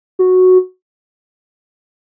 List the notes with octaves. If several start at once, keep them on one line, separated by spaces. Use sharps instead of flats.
F#4